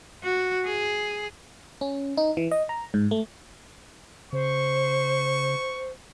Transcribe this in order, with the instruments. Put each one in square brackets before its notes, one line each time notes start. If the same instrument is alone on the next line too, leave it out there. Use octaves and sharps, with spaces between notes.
[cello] F#4
G#4
[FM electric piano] C#4
D#4
E3
D#5
A#5
G#2
A3
[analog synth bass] C#3 [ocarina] C5 [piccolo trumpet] C#6